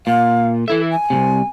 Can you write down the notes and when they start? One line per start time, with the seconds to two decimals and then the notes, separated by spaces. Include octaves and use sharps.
0.07 A#2 F5
0.68 E3 E4 A4 E5
0.91 G#5
1.10 C2 G#2 C3